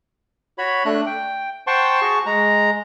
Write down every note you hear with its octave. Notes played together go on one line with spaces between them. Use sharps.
F#4 C#5 B5
A3 D4 F#6
G5
C5 F#5 G5 A5 C6 C#6
F#4 G#4 A5 C#6
G#3 A#5